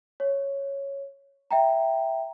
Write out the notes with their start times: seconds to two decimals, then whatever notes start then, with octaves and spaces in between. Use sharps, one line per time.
0.20 C#5
1.51 E5 G5 A#5